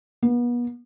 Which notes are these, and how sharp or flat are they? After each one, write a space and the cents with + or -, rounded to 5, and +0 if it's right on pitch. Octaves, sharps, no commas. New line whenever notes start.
B3 -35